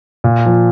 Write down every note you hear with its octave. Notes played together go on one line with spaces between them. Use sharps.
A#2
F3